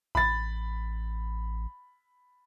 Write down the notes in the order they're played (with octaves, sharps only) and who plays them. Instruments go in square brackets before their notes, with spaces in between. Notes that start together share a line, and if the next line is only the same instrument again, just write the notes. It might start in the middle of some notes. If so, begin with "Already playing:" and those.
[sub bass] A1 [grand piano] B5 A6